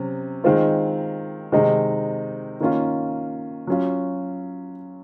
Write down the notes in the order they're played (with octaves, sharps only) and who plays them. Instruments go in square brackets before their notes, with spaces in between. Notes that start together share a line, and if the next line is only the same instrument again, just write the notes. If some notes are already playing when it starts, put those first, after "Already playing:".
Already playing: [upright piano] C3 F#3 C#4
D#3 G#3 C4 F4
C3 D#3 G#3 D#4
D#3 A#3 C#4 F4
F#3 C#4 F4